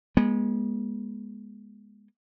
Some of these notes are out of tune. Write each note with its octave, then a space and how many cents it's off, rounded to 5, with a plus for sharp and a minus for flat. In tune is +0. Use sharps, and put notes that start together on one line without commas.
G#3 -10 B3 -40